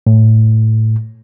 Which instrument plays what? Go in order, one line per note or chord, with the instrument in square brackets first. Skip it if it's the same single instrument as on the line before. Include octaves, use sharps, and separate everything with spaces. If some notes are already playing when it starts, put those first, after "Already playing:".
[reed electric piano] A2